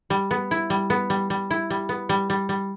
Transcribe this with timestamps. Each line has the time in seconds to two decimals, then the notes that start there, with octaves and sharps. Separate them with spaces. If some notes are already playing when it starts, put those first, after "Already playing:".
0.10 G3
0.31 B3
0.51 E4
0.70 G3
0.90 B3
1.10 G3
1.30 G3
1.50 E4
1.70 G3
1.89 B3
2.09 G3
2.30 G3
2.49 G3